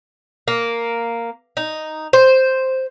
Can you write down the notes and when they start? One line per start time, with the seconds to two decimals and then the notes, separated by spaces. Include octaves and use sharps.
0.48 A#3
1.57 D#4
2.13 C5